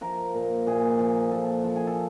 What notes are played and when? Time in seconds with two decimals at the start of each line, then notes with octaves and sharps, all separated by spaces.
0.01 F3 A#4
0.35 A#2
0.67 A#2 G#4
0.99 F3
1.31 A#2 A4
1.64 F3
1.76 G#4
1.87 A4